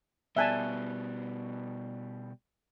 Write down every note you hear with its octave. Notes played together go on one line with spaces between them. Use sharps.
B2 G3 D5 E5 G#5 A5 F#6 G7